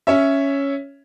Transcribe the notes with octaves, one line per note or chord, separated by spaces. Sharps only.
C#4 C#5 E5